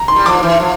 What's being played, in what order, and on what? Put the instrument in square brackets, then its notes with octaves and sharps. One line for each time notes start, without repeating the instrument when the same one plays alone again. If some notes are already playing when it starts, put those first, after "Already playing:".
Already playing: [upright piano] A#5
C6
[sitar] G3
[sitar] F3 [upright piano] D6
[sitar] E3
F3